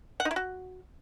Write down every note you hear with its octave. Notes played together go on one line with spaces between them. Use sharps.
F#5
D#4
E4
F#4